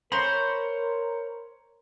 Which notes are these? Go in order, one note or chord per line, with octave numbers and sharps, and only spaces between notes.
A#4 C5 C#5 A#5 B5